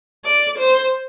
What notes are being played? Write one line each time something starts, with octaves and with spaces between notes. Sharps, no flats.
D5
C5